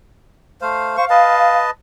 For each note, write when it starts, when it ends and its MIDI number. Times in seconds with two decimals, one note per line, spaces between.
0.61 0.97 57
0.61 0.97 72
0.61 0.97 77
0.97 1.05 72
0.97 1.61 77
0.97 1.05 85
1.10 1.71 71
1.10 1.71 75
1.10 1.71 81